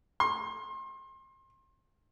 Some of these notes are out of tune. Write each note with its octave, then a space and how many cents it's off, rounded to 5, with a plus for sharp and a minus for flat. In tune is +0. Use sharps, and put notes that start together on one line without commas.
C6 +35